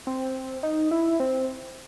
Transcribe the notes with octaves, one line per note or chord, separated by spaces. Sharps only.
C4
D#4
E4
C4